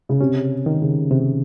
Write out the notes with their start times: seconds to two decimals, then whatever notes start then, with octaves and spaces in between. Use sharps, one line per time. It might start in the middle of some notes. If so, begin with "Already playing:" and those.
0.09 C#3
0.21 C3 C#4
0.66 D#3
0.81 C#3
1.11 C3